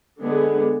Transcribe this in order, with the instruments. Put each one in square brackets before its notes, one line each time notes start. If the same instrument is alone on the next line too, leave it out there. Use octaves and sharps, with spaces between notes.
[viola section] D3 G#3 B3 D4 G#4